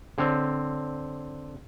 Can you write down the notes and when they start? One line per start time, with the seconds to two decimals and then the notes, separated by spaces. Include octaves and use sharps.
0.18 D3 C4 C#5